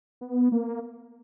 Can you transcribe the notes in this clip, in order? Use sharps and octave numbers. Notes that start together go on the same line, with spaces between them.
B3
A#3